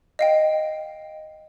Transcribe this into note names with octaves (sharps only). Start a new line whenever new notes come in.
D#5 F5 G5